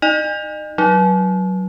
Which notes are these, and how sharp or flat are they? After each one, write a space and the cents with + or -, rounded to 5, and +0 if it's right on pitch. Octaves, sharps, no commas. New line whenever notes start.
D#4 +0 D#5 -35
F#3 +10 D#4 +0